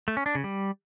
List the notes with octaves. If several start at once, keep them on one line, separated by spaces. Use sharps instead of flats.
A3
C#4
D4
C#3
G3